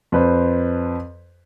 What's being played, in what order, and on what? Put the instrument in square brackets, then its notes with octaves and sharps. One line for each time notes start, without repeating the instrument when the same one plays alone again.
[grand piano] F2 B4 C5